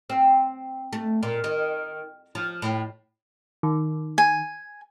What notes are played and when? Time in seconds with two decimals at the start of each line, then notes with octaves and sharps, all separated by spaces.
0.10 C4
0.93 A3
1.23 A#2
1.44 D#3
2.35 F3
2.62 A2
3.63 D#3
4.18 G#5